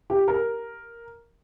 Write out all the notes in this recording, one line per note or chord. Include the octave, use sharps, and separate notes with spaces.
G4
A#4